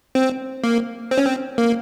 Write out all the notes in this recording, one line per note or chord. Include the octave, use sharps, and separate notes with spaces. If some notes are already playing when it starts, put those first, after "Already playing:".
C4
A#3
C4
C#4
C4
A#3